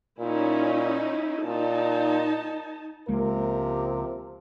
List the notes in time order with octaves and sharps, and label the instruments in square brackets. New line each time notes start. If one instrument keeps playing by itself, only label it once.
[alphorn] A#2 [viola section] C#4 D#4 E4
[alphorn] A#2 [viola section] D#4 A5
[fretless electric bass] C#2 G#3 A#3 [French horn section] C3 F3 A#4